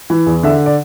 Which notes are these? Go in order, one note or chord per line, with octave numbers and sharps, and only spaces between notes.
E3
E2
D3 E5
D5